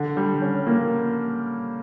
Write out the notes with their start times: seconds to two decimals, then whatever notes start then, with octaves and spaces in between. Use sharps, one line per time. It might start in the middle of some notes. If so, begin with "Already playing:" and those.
Already playing: D3
0.17 G3
0.42 C#4
0.67 A#3